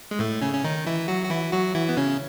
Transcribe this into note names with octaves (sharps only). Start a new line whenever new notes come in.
G#3
A2 A3
C#3 C#4
C#4
D#3 D#4
E3 E4
F#3 F#4
F#4
E3 E4
F#3 F#4
E3 E4
B3
C#3 C#4